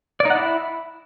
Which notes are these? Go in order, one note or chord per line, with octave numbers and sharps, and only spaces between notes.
D5
D#4
F#5
E4